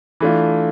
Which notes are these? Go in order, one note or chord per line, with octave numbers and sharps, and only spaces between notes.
E3 A3 D4 F4